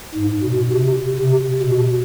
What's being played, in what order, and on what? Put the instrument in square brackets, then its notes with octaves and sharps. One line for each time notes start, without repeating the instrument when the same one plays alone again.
[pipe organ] G#2
B2
C3
C3
B2